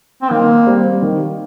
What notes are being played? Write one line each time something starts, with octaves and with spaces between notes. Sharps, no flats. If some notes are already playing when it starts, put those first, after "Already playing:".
C4
D#3 A#3
G3 C4
D#3